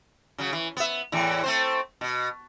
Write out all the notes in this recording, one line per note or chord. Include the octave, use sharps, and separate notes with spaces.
C#3 F#3
E3
B3 E5
E2 A2 E3
A3 C4 C5
B2